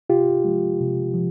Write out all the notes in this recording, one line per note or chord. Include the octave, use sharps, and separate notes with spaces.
C3 F4 G4
F3 G#3
C3
F3